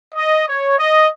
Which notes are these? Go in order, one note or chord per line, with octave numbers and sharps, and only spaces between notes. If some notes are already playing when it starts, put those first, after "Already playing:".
D#5
C#5
D#5